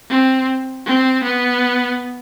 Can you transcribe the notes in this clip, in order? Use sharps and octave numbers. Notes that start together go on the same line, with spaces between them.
C4
C4
B3